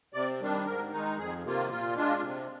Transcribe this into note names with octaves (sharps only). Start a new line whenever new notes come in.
C3 D5
D#3 G3 D4
G#2 A#4
D#3 G#3 D#4
F2 G#4
C3 D#3 A#3 F4
A#2 F4
G#3 D4 F4
C3